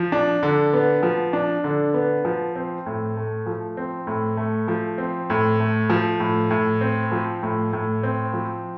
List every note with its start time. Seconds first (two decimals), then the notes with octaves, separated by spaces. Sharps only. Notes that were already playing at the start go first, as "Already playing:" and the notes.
Already playing: F3
0.12 D4
0.43 D3
0.74 B3
1.03 F3
1.33 D4
1.64 D3
1.94 B3
2.25 F3
2.56 C4
2.86 A2
3.17 A3
3.46 F3
3.77 C4
4.07 A2
4.37 A3
4.68 F3
4.98 C4
5.30 A2
5.60 A3
5.90 F3
6.20 A2
6.50 A2
6.81 C4
7.12 F3
7.43 A2
7.73 A2
8.03 C4
8.33 F3